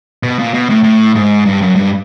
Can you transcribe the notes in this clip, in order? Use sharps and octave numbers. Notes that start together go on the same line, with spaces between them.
B2
A#2
B2
A2
A2
G#2
G2
F#2
G2